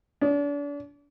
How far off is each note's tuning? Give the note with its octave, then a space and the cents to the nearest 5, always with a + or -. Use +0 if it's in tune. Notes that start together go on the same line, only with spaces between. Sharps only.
D4 -35